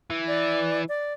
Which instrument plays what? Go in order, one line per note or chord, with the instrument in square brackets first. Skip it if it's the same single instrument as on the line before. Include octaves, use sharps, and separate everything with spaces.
[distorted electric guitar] E3
[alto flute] D5
D5